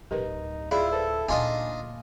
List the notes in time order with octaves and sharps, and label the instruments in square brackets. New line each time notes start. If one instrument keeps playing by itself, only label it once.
[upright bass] D1 G#1 [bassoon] D#4 [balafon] G4 A#4 B4
[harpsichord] E4 [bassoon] F4 [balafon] G#4 D5
[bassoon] A4 [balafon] B4 C5
[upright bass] D2 A#2 [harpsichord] D4 F4 D#5 [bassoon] D#4 [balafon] G#5